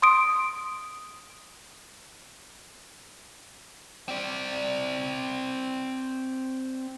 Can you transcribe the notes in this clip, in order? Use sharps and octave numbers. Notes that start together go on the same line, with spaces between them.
C6 D#6 D7
C4 D5